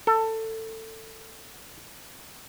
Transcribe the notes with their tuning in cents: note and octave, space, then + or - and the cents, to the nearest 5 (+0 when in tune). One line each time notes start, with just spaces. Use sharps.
A4 +20